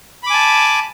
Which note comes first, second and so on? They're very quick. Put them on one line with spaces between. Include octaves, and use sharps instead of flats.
B5 D6 G#5 A5